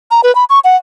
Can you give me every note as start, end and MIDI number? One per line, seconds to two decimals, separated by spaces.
0.11 0.21 82
0.24 0.34 71
0.35 0.44 83
0.50 0.59 85
0.64 0.76 78